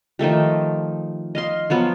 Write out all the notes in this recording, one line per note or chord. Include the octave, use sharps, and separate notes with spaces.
D#3 F3 A3 G4
D#5 F5 C6
F3 F#3 B3